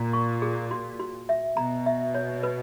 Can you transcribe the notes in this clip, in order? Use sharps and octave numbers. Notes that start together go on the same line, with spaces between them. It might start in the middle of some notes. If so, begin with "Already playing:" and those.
Already playing: A#2 A#5
C#6
G#4
F#4
F#4
E5
B2 A#5
E5
C#5
B4